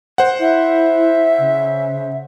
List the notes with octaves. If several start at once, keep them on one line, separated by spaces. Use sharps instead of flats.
C5 F#5
E4 E5
C#3